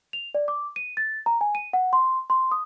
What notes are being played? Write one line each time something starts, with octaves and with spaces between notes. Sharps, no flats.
F7
D5
D6
D#7
A6
A#5
G#5
D#7
F#5
C6
C6
D#6